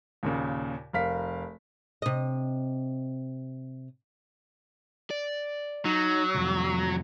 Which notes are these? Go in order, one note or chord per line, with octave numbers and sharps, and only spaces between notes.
D#2 A#2 C#3
F1 A#4 F5 B6
C3 D#5
D5
F#3 D#4
C2 F2